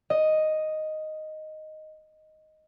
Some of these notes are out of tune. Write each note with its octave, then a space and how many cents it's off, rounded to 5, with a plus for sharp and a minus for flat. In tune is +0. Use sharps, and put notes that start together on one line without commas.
D#5 +0